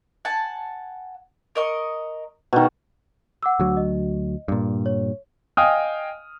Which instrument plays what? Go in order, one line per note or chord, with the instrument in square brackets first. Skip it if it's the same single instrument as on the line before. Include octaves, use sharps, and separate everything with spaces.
[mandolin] F#5 G#5 A5
A#4 D#5 C#6
[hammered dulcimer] B2 D#3
[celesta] F#5 D6 E6
[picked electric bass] D2 F#3
[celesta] D#5
[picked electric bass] G2 A#2
[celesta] C#5
[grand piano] D#5 F5 G5 G#5 D#6 F6